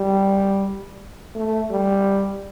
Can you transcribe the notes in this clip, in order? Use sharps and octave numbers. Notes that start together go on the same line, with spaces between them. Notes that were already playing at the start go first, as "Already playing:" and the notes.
Already playing: G3
A3
G3